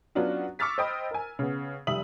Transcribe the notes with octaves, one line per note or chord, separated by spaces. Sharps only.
F#3 B3 C#4 D4 F4 F#4
C#6 D6 E6 F6 A6 B6
C5 D#5 G5 B5 D#6
A#4 G#5
C#3 B3
F1 G3 E5 D#6 F#7